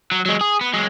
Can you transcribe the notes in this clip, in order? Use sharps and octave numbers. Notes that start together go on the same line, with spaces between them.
F#3
F#3 G#3
G#4
B3
F#3 G#3